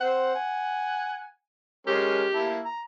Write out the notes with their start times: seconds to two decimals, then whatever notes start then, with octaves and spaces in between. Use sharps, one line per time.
0.01 C4 C5 F#5
0.35 G#5
1.87 G#3 C#4 G4 A#4
2.34 A#3 E4 A5
2.65 A#5